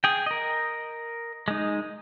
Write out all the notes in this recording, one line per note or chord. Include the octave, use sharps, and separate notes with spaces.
G#4 G5
A#4 D#5
G#3 D#4